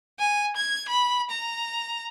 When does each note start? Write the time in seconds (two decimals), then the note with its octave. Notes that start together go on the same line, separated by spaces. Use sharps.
0.20 G#5
0.56 G#6
0.89 B5
1.30 A#5